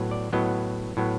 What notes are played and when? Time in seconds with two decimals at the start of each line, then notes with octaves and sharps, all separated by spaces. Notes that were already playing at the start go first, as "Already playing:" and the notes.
Already playing: A2 F#3 B3
0.11 D5
0.33 A2 F#3 B3 D#5
0.97 A2 F#3 B3